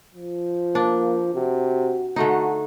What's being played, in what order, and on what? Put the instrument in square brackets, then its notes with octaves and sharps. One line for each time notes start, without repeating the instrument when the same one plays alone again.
[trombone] F3
[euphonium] A#3 [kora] D4
[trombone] C3 [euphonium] F#4
[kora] D3 A3 D#4 [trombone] F#4